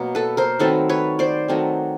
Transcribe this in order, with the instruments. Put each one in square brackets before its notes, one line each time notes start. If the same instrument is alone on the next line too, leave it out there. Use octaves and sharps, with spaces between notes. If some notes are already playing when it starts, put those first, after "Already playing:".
Already playing: [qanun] B2 F#3 A#3
A4 B4
A#4 C5
D#3 F#3 A3 C4 A4 B4
B4 C#5
C5 D5
D#3 F#3 A3 C4